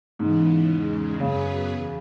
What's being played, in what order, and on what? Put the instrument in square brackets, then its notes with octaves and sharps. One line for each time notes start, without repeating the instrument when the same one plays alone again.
[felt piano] G#2 [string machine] C#3 E3 B3
[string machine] E2 C#3 G#3
[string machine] F#2 F#3 B3 G#4 B4 [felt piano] C#3
[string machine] E2